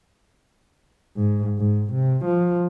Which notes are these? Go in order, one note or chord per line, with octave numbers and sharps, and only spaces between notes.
G#2
G#2
C3
F3